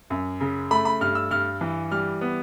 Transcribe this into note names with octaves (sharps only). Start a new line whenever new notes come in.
F#2
C#3
A3 B5
B5
G2 F6
E6
G2 F6
E3
G3 F6
B3